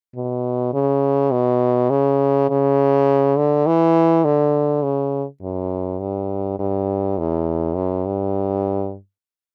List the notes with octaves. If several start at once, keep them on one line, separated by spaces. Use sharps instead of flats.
B2
C#3
B2
C#3
C#3
D3
E3
D3
C#3
F#2
G2
G2
E2
F#2
G2